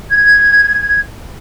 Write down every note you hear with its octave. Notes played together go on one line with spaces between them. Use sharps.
G#6